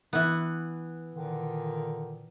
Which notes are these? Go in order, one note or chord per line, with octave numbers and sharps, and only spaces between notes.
E3 B3
A#2 D3 D#3